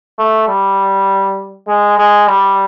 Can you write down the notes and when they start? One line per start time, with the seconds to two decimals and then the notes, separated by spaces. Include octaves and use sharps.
0.19 A3
0.48 G3
1.68 G#3
1.99 G#3
2.28 G3